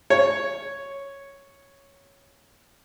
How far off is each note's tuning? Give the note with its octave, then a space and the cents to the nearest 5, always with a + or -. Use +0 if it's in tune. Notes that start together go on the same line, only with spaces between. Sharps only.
C#5 +0